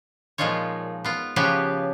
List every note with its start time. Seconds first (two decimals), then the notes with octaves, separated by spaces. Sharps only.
0.38 A#2 F3 G#3 D#4 F4 C#5
1.05 B3 F4
1.36 C#3 F3 B3 G4 B4 C#5